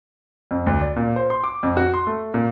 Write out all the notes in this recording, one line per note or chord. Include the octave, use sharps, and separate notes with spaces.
F2
D2
D5
A#2
C5
C6
D6
F2
F#4
C6
A3
A#2